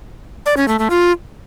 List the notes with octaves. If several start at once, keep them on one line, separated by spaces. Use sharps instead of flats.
D5
C#4
A3
A3
F4